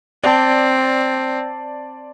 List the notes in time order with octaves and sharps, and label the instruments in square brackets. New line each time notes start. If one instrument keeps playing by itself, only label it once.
[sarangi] C4 [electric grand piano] D5 A5